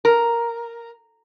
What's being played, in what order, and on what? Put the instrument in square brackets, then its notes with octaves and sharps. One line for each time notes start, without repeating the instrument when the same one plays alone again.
[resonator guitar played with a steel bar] A#4